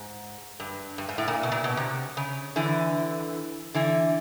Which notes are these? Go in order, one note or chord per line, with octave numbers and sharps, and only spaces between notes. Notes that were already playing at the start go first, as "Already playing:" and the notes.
Already playing: G#2
G2
G2
G#2
A2
A#2
B2
A#2
B2
C3
C#3
D3 E3
D3 E3